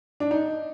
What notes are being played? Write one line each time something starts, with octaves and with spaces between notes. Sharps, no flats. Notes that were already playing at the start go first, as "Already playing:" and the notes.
D4
D#4